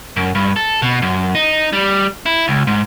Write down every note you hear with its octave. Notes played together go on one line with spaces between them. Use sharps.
F#2
G2
A4
B2
F#2
D#4
G3
E4
C#2
G#2